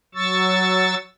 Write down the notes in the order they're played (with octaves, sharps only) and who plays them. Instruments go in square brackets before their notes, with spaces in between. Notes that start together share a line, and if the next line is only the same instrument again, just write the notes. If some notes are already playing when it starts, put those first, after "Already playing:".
[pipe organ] F#3 C#6 E6 A6